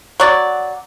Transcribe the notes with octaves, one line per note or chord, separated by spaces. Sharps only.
F#3 D5